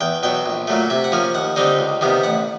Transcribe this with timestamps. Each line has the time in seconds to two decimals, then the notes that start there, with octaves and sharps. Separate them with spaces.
0.01 E2 G5
0.23 B2 F#3 G5
0.46 A#1
0.67 A#2 F#3 A3
0.90 C3 E5
1.04 F#5
1.12 F3 A#3 C#4
1.34 D#2 F#5
1.56 D3 G3 C4 D#4
1.79 C#2
2.01 C3 D#3 G3 B3
2.23 A1 F#5